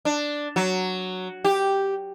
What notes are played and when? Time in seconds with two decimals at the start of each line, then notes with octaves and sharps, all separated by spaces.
0.05 D4
0.56 F#3
1.44 G4